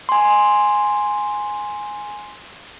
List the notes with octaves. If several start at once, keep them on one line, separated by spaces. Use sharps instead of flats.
G#5 C6